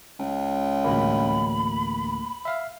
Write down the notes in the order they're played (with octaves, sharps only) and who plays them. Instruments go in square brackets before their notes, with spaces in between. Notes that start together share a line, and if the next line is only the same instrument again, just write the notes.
[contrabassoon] C#2
[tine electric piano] A1 D2 A#3 [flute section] B5
[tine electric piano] E5 F5